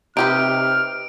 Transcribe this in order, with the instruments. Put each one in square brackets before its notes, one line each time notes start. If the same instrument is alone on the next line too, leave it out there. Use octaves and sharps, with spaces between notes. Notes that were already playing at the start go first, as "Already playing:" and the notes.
[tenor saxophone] C3 [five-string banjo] D#4 G4 B4 [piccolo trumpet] F6 [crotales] D7